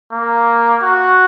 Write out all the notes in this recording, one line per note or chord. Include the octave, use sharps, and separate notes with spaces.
A#3
F#4